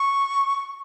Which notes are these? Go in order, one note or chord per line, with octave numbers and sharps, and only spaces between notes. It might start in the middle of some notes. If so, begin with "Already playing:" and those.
Already playing: C#6